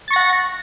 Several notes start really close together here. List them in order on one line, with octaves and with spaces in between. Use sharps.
A6 C#6 A#6 F#5